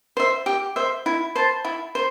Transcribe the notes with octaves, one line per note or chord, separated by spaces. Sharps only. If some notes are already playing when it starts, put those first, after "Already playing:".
C5 E5
G4
C5 E5
E4
C5 A5
E4
C5